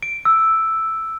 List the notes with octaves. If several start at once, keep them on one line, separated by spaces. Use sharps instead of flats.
D7
E6